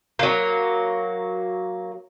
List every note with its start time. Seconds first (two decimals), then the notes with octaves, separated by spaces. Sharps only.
0.19 F#3 A#3